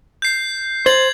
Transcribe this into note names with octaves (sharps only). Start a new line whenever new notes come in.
G6 C7
C5 G#6 A6 F#7